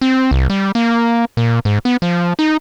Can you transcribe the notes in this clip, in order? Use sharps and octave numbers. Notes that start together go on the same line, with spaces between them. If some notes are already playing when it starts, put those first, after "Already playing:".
C4
C2
G3
A#3
A#2
G#2
B3
F3
D#4